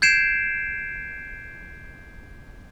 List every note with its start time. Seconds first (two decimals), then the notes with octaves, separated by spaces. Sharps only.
0.02 G6 G#6 C7 D7 E7